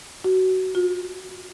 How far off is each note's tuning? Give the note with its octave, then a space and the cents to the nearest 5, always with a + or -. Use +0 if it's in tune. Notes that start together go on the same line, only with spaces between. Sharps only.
F#4 +20
F#4 -45